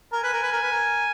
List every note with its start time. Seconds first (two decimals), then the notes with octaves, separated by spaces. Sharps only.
0.12 A#4 G#5
0.23 B4
0.33 A#4
0.43 B4
0.52 A#4
0.62 B4
0.72 A#4